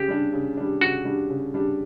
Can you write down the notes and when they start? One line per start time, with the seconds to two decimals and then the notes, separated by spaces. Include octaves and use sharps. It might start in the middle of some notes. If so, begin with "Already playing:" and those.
Already playing: C#3 G4
0.08 G3 D4
0.33 C#3
0.57 G3 D4
0.81 C#3 F#4
1.05 G3 D4
1.30 C#3
1.54 G3 D4